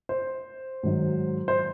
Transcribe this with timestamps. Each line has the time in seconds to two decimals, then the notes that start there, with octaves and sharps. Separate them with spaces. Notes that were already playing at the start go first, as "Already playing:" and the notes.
0.09 C5
0.83 G#2 D#3 F#3
1.48 C5